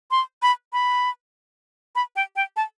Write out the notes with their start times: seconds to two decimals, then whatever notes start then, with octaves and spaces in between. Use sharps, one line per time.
0.11 C6
0.42 B5
0.73 B5
1.95 B5
2.16 G5
2.36 G5
2.56 A5